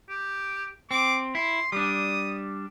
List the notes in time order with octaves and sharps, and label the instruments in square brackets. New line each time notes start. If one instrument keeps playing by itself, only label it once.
[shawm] G4
[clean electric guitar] C4 [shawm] D6
[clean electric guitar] E4 [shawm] C6
[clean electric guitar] G3 D4 [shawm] D#6